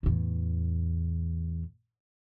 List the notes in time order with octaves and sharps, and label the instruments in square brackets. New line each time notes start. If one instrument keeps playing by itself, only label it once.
[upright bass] E2 A2